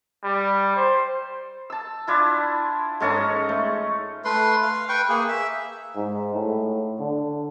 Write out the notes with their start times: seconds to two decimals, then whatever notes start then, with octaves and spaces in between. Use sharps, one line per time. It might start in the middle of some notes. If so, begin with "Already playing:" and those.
0.23 G3
0.76 C5
1.70 A5 E6
2.07 D4 E4 F4
3.00 G#2 G#3 C#4 A4 C#5 A#5
3.49 A3
4.25 A3 B4 C6
4.62 F5
4.89 B4 G5 C#6
5.09 A#3 G#4
5.28 E5
5.96 G#2
6.34 A2
6.99 D3